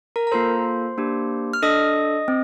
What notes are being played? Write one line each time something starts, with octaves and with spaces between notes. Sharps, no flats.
A#4 A#5
A#5
A#3 F4 A4 C5 C6
A#3 D4 G4
F6
D4 A4 D#5 D#6
C4